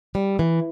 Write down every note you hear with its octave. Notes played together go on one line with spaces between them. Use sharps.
G3
E3